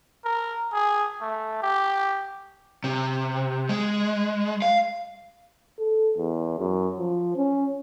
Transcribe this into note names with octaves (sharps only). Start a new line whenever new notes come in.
A#4
G#4
A3
G4
C3
G#3
F5
A4
E2
F#2
F3
C#4